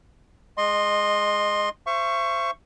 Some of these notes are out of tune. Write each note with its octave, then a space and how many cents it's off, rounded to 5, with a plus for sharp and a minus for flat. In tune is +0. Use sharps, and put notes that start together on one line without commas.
G#3 +0 D#5 -15 C6 +15
C5 +0 E5 +45 C#6 +0